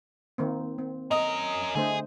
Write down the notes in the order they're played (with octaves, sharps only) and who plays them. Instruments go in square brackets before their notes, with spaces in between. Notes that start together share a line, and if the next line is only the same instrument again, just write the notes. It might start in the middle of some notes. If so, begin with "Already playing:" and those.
[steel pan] D#3 A#3 C4
C4
[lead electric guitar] C#4 A#4 [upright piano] D#5 D#6
[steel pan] D3 A3 C5 [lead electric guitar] G#4